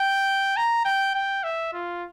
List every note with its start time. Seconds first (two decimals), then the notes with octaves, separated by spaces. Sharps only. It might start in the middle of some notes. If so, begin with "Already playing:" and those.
Already playing: G5
0.57 A#5
0.85 G5
1.15 G5
1.44 E5
1.74 F4